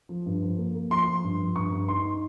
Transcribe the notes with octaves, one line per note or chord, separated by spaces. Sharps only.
F3
G2
F3
A#3
A#3
F3 C6
F3
G2
F3
G2 C#6
G2
D#4 C6
D#4